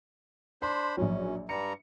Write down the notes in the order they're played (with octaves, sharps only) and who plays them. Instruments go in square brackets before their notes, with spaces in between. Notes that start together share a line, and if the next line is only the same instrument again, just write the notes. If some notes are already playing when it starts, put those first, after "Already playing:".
[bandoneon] D4 C5 B5 [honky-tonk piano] C6
[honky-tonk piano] A#1 F#3 [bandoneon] C#4
[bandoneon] G2 G3 A#5 [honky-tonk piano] C#7